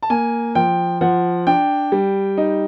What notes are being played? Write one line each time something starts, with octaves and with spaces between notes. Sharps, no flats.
A5
A#3 G#5
F3 G5
F3 F#5
D4 G5
G3
D#4